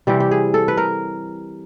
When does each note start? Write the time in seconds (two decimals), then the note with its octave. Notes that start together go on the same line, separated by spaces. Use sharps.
0.07 C3 E3 G3 G4
0.20 G4
0.31 G#4
0.54 A4
0.68 B4
0.77 A#4